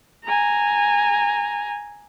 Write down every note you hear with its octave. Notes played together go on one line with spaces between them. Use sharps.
G#5 A#5